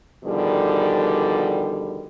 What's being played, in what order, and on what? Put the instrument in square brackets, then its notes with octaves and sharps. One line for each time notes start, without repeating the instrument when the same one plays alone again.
[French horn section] B2 D3 D#3 F3 G3 G#4